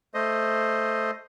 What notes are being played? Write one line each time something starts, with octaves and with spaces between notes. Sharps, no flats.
A3 C5 D#5